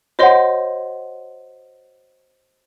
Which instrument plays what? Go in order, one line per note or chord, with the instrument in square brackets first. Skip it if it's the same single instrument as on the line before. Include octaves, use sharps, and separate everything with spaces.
[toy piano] F#4 C#5 F#5 [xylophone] C5 D#5 C6